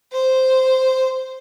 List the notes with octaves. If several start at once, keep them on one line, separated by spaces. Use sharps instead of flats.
C5